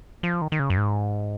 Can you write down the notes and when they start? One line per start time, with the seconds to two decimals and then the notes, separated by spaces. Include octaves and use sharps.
0.23 F3
0.42 D#3
0.52 D#3
0.60 C#3
0.70 F#2
0.77 G#2